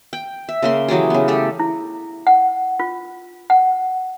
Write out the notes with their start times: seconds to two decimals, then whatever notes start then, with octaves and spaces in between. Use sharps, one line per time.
0.13 G5
0.49 E5
0.62 C#3 A#3 C6
0.88 E3 F#3 G4 G#4
1.10 C#3 B3
1.28 A3 G4 A4
1.60 E4
2.27 F#5
2.80 F4
3.50 F#5